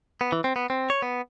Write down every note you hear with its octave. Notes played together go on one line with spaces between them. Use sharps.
B3
E3
C4
B3
C4
C#5
B3